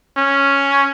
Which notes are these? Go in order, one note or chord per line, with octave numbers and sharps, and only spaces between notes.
C#4